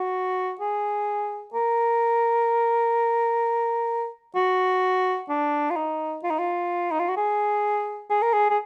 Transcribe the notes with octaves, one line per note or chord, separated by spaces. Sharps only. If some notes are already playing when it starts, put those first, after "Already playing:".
Already playing: F#4
G#4
A#4
F#4
D4
F4
D#4
F4
D#4
F4
D#4
F4
F#4
G#4
G#4
A#4
G#4
G#4